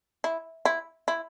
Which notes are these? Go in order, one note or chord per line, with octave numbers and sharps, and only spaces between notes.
E4
E4
E4